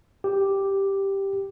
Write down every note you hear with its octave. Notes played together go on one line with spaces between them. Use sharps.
G4